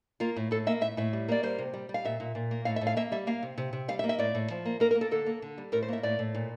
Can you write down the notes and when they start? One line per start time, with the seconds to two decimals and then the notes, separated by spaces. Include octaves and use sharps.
0.20 A#3 F4
0.36 A2
0.51 A2 A4
0.67 A#3 E5
0.81 A2 E5
0.97 A2 E5
1.13 G3
1.28 A#3 D5
1.43 G3 C5
1.58 C3
1.74 G3
1.89 G3
1.94 F5
2.05 A#2 E5
2.20 A#2
2.35 A#2
2.51 A#3
2.65 A2 F5
2.76 E5
2.81 A2
2.87 F5
2.97 A#3 E5
3.12 G3 E5
3.27 A#3 F5
3.43 C3
3.58 C3
3.73 C3
3.88 G3 F5
3.99 E5
4.04 A#3
4.09 E5
4.19 A2 D5
4.35 A2
4.50 F3
4.65 A#3
4.80 A#3 A#4
4.91 A#4
4.95 A#3
5.01 A4
5.11 D3 A4
5.26 A#3
5.42 D3
5.58 G3
5.72 A2 A#4
5.83 C5
5.88 A#3 E5
6.03 A2 D5
6.19 A2
6.35 A#2